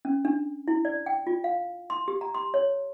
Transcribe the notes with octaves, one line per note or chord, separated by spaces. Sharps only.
C#4
D4
E4
D5
G5
F4
F5
C6
G4
A#5
C6
C#5